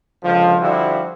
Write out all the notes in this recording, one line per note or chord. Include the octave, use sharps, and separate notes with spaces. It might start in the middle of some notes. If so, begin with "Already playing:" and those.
C#2 D3 F3
D3 F3 G3 E4 F#4